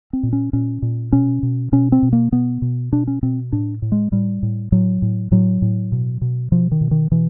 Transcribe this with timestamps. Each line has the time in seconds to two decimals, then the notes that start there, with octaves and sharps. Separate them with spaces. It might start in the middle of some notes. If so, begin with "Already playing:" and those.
0.13 C4
0.23 A#2
0.33 C#4
0.53 A#2 C#4
0.82 A#2
1.12 B2 C#4
1.43 B2
1.72 B2 C#4
1.92 C4
2.03 B2
2.13 A#3
2.32 B2 B3
2.62 B2
2.92 B2 D4
3.07 C#4
3.23 B2 C4
3.52 A2 D4
3.82 A2
3.92 G#3
4.12 A2 G3
4.43 A2
4.72 A2 F#3
5.02 A2
5.32 A2 F#3
5.62 A2
5.92 B2
6.22 B2
6.52 B2 F3
6.72 D#3
6.81 B2
6.91 D#3
7.11 B2 E3